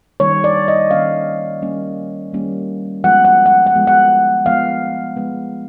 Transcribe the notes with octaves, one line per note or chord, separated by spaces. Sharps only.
D#3 G3 A#3 C#4 C#5
D5
D#5
D#3 G3 A#3 C#4 F5
D#3 G3 A#3 C#4
D#3 G3 A#3 C#4
F3 G#3 B3 F#5
F#5
F#5
F#5
F3 G#3 B3
F#5
F3 G#3 B3 F5
F3 G#3 B3